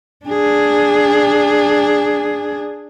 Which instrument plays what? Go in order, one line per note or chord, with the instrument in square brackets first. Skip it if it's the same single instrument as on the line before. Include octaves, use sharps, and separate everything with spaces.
[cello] D4 G#4